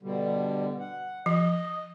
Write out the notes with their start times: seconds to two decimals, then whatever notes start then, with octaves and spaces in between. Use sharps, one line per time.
0.03 B2 D3 G3
0.79 F#5
1.26 F3 D#5